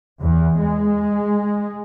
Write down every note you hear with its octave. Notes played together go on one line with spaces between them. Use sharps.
E2
G#3